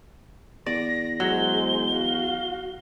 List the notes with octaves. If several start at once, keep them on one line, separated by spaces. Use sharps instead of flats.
E2 D5 A#6
F#3 G#3 C5 G7
F#4 F5